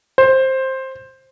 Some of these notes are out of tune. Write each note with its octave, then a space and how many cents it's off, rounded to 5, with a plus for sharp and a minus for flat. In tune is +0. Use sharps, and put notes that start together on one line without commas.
C5 +10